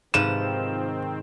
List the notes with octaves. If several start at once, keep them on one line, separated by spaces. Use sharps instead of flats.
G#2 C3 D#3 F3 C4 B4 E7